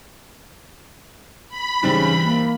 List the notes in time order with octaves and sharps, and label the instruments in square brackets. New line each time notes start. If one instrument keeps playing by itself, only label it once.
[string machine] B5
[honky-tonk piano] G#2 G3 C4 [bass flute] C#3 [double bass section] E3
[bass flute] A#3